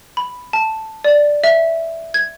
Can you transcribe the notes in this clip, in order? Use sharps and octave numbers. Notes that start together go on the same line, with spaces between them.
B5
A5
D5
E5
G#6